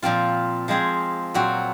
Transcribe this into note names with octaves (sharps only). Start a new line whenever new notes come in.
A#2 F3 C4 F4
F3 G#3 C4 F4 G#4
A#2 F#3 C4 F#4